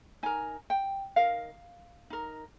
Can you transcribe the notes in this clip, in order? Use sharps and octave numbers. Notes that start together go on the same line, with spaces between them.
D#4 A#4 G#5
G5
D#4 A#4 F5
D#4 A#4